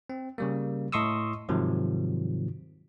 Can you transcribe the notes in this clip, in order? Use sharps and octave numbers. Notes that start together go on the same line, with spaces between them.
C4
C#3 G3 A#3
A2 D#5 C6 C#6 D#6 E6
G#2 C3 D#3 F3 F#3